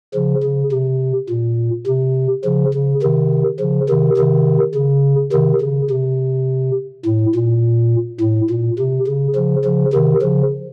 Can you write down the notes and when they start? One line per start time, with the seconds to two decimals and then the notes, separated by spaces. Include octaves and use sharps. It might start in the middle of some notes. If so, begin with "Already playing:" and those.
0.14 C#3 F3
0.43 C#3
0.72 C3
1.29 A#2
1.87 C3
2.44 C#3 F3
2.74 C#3
3.02 C3 D#3
3.60 C#3 F3
3.89 C3 D#3
4.17 C3 D#3
4.75 C#3
5.33 C3 D#3
5.61 C#3
5.90 C3
7.06 A2
7.35 A#2
8.21 A2
8.50 A#2
8.79 C3
9.08 C#3
9.35 C#3 F3
9.65 C#3 F3
9.93 C3 D#3
10.22 C#3 F3